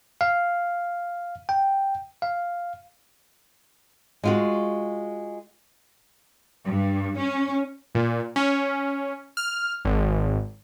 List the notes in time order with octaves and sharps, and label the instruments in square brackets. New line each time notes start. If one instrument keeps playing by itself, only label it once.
[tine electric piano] F5
G5
F5
[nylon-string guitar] G#3 F4 F#4
[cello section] G2
C#4
[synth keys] A#2
C#4
F6
G#1